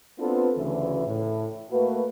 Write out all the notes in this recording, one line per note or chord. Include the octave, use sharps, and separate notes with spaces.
B3 C4 D4 F4 A4 B4
D2 C#3 E3
A2
A3 A#3 F#4 B4